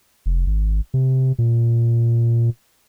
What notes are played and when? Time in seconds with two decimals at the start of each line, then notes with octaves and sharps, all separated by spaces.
0.26 F1
0.46 G#1
0.94 C3
1.39 A#2